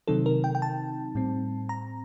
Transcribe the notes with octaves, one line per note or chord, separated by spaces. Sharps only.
C3 D#3 F#3 C4 D#4 A4
A#4
G5
G5
A5
A2 G3 C4
A#5